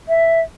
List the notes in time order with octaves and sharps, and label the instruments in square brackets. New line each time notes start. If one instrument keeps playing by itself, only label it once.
[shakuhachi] E5